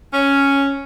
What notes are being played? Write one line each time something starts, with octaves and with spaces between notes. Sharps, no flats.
C#4